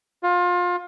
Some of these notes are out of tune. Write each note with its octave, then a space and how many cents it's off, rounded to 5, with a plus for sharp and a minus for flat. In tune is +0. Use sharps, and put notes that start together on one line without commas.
F4 +25